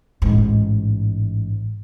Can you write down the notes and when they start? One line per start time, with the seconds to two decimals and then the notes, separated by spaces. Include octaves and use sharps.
0.22 A1 G#2